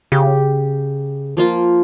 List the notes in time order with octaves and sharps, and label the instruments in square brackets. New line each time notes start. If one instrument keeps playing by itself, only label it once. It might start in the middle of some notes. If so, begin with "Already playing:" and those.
[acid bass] C#3 [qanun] G4
[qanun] F3 A#3 F4